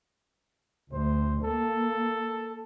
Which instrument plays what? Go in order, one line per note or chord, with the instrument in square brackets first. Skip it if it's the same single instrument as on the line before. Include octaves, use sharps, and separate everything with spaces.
[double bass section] D2 [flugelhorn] C5
[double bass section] A#3 [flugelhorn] A4